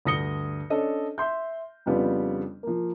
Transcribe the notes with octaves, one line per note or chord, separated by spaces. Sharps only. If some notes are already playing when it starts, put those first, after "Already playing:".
D2 G2 D#6 A#6 C#7 G7
C#4 D4 A4 D#5
E5 C6 G6
F2 C#3 G3 B3 D4 F4
F3 A#3